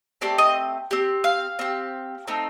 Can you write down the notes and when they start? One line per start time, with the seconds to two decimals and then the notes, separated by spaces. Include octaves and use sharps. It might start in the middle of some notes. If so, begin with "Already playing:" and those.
0.21 A3 C4 G4 D5
0.38 D#5
0.91 C4 G4
1.24 F5
1.59 C4 G4
2.28 A3 C4 D#4